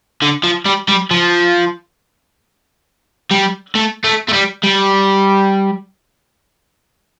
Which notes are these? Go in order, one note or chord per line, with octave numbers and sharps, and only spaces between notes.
D3
F3
G3
G3
F3
G3
A3
A3
A3
G3
G3